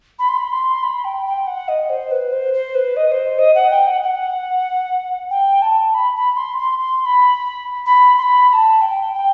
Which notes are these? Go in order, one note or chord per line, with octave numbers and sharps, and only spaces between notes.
B5
C6
B5
C6
B5
G5
G5
F#5
D#5
C5
B4
C5
C5
B4
D#5
D#5
C5
D#5
F#5
G5
F#5
G5
F#5
G5
A5
B5
B5
C6
C6
C6
C6
B5
B5
C6
B5
B5
A5
G5
G5